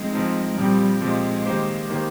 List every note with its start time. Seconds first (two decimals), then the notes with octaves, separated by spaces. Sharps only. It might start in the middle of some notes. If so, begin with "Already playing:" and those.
Already playing: F3 G#3 C4 D#4
0.13 F3 C4 D#4
0.57 A#2 F3 G3 C4 G4
1.01 A#2 F3 G#3 C4 G4
1.46 D#3 A#3 D#4 G4 C5
1.90 D#3 A#3 D#4 G4 C5